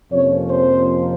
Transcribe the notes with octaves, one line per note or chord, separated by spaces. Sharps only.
F2 C3 F3 A#3 C#4 C#5
C5